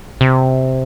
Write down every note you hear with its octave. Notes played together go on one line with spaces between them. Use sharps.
C3